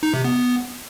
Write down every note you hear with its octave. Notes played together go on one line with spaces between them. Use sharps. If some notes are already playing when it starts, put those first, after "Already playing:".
D#4
C3
B3